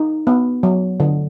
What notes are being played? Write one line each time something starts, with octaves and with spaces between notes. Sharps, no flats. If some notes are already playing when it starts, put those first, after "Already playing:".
Already playing: D#4
B3
F#3
D3